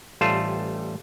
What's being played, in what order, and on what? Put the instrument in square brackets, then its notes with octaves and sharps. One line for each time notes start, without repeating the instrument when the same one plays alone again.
[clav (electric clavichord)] A1 G3 A3 F4 C5 A5